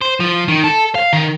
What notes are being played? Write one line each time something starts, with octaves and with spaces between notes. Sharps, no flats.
C5
F3
D#3
A4
F5
D#3